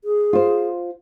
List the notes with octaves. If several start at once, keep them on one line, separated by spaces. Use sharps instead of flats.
G#4
F4 C5